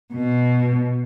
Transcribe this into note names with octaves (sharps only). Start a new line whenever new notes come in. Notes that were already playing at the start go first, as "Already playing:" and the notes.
B2